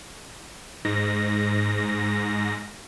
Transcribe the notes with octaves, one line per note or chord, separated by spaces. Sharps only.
G#2 A#6